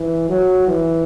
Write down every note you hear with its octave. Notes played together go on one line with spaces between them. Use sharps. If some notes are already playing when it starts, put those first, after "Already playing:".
Already playing: E3
F#3
E3